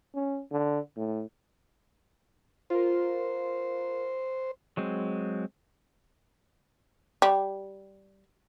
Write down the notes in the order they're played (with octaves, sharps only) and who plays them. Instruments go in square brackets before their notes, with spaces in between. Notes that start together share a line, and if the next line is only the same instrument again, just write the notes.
[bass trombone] C#4
D3
A2
[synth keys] F4 A#4 [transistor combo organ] C5
[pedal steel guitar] F#3 G#3 C4
[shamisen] G3